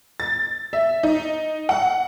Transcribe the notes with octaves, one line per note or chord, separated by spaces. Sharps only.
A6
E5
D#4
F#5